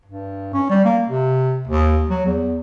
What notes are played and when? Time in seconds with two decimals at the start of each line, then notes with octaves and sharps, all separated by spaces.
0.05 G2
0.53 C#4
0.70 G3
0.85 A#3
1.09 C3
1.67 D#2
2.10 F#3
2.25 E2